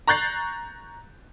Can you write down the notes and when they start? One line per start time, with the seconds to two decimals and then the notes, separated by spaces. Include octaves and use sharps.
0.07 A#5 C#6 F#6 G6 A6 C7